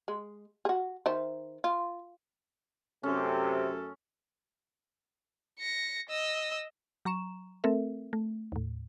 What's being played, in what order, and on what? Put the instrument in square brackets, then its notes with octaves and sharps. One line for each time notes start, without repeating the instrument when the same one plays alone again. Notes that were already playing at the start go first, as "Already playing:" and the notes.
[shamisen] G#3
F#4 G#4
D#3 C5 E5
F4
[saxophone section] F#2 A3 A4 [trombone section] C3 [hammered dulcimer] C#4
[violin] A#6 C#7
D#5 E6
[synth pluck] F#3 A#5 C#6 E7
A3 C4 A4 A#4 E5
A3
D#2 A2